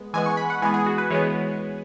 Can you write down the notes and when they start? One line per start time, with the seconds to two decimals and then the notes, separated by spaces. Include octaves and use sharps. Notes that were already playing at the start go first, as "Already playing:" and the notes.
Already playing: G#3 B3
0.14 E3 G#3 B3 G#5
0.26 C#6
0.37 B5
0.50 F#5
0.62 E3 G#3 B3 G#5
0.74 G#4
0.86 F#4
0.98 B4
1.10 E3 G#3 B3 C#5